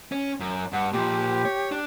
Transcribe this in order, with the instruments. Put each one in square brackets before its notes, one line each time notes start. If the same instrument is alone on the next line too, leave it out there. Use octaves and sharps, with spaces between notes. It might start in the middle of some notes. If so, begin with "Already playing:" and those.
[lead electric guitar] C#4
F#2
[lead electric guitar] G2 [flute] F#5
[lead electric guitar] A#2 F3 [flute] G4
[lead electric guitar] C#5
D4